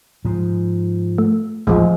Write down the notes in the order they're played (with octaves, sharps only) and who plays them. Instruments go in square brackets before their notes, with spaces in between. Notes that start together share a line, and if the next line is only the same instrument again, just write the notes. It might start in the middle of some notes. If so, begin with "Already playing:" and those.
[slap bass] G#2 F3
[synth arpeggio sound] A3
[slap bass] A1 D#2 G#2 [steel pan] F3 G#3